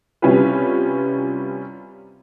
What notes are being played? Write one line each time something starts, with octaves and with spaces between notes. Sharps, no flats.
C3 G3 C#4 E4 F4 B4